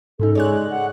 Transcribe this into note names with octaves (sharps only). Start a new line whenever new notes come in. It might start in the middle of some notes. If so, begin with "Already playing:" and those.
G#2 C#3 D#4 A4
G#3 C#5 D5 F#6
F#5